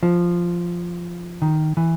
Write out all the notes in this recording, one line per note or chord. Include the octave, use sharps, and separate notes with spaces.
F3
D#3
E3